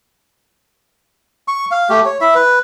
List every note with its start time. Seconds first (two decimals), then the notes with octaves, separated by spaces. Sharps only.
1.48 C#6
1.71 F5
1.90 A3 G4
2.05 C#5
2.21 E4 E5
2.35 B4